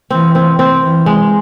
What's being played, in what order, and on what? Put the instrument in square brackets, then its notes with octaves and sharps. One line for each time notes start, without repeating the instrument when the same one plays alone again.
[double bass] E3 [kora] C4
[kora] C4
C4
[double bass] E3
[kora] G#3